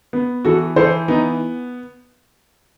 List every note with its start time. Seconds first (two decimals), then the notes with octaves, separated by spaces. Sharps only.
0.13 B3
0.45 E3 F#4 A4
0.76 E3 A4 C5
1.08 B3 D#4